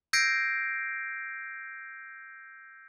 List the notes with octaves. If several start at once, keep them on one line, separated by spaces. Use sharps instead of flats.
E6 G6 G#6 A#6 C7 D7